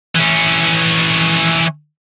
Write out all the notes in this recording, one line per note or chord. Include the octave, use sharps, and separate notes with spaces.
E3 C#4